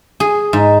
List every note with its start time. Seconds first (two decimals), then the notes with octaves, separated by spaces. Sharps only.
0.20 G#4
0.53 G#2